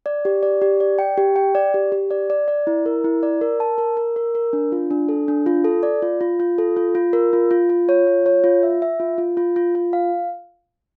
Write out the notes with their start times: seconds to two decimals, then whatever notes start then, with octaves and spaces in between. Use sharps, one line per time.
0.06 D5
0.25 G4
0.43 D5
0.61 G4
0.80 D5
0.99 G5
1.17 G4
1.36 G5
1.55 D5
1.74 G4
1.92 G4
2.11 D5
2.30 D5
2.48 D5
2.67 E4
2.86 A#4
3.04 E4
3.23 D5
3.41 A#4
3.60 A5
3.78 A#4
3.97 A#4
4.16 A#4
4.35 A#4
4.53 D4
4.72 F4
4.90 D4
5.09 A4
5.28 D4
5.46 F4
5.64 A4
5.83 D5
6.02 F4
6.21 F4
6.40 F4
6.58 A4
6.77 F4
6.95 F4
7.13 A#4
7.33 F4
7.51 F4
7.69 F4
7.89 C#5
8.07 F4
8.26 C#5
8.44 F4
8.63 E5
8.82 E5
9.00 F4
9.18 F4
9.37 F4
9.56 F4
9.75 F4
9.93 F5